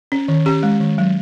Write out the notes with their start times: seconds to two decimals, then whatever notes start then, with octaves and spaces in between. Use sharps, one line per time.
0.12 C#4
0.28 D#3
0.46 C#4 G4
0.63 G#3
0.80 D#3
0.98 F#3